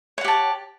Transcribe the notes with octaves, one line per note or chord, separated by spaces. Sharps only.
G4 C#5 F#5 A5